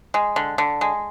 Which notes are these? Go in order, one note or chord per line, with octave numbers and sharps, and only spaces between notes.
G#3
D3
D3
G#3